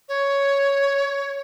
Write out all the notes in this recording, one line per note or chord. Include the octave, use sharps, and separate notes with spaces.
C#5